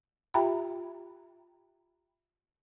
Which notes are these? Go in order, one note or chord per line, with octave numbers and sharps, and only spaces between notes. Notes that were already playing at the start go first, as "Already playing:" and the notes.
F4 G4 E5 G5 A#5 B5